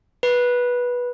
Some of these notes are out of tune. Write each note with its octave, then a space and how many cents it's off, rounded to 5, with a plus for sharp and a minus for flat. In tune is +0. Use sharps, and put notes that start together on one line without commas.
B4 -15